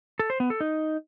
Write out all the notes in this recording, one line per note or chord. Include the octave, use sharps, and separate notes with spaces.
A4
C5
B3
A4
D#4